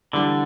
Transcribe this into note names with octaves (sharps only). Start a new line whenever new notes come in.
D3 E3 G3 D4